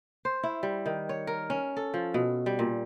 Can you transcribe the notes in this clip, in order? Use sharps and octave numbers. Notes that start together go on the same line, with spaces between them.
C5
E4
G3
D#3
C#5
A#4
C#4
A4
F3
B2
G3
A#2